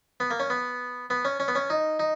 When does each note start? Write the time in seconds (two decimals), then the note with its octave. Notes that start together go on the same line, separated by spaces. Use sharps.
0.20 B3
0.31 A#3
0.40 C#4
0.50 B3
1.10 B3
1.25 C#4
1.40 C#4
1.48 B3
1.55 C#4
1.70 D#4
1.99 D#4